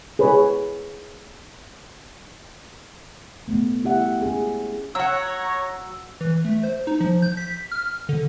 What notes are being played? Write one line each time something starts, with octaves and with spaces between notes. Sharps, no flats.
G#4 B4 C#5 B5
A3 B3
E4 G4 E5 F#5
C#4 G#4
F#3 C#5 F#5 A#5 E6
E3
A3
C5
D#4
F3
G6
B6
F6
D3